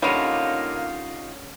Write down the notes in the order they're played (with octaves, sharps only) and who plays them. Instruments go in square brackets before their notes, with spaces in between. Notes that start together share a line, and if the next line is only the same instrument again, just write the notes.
[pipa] D3 G3 [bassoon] A#3 [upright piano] C#4 D#7 [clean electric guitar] D#4 F4 C#5